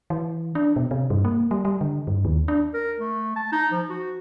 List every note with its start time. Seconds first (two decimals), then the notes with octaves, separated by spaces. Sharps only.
0.10 E3
0.55 D4
0.76 B2
0.91 C3
1.10 G2
1.25 A#3
1.51 G3
1.65 G3
1.81 D3
2.07 G2
2.25 D#2
2.48 D4
2.74 A#4
3.00 A3
3.36 A5
3.52 D#4
3.72 F3
3.90 F#4